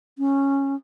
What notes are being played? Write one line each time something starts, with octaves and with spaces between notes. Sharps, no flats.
C#4